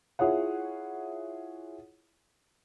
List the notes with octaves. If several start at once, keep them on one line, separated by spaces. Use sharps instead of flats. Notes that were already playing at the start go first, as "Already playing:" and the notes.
E4 F4 G#4 C#5 F#5